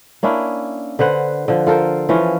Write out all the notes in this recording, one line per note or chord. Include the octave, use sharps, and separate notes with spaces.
A#3 C#4 D4 E4
D3 B4 C5 F#5
D3 F3
F4 A4 A#4 C5
E3 F3 C#4 F4